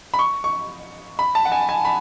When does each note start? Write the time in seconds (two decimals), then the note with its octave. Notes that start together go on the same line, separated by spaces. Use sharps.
0.14 B5
0.19 C#6
0.44 C#6
1.19 B5
1.35 A5
1.45 F#5
1.52 G#5
1.69 G#5
1.85 B5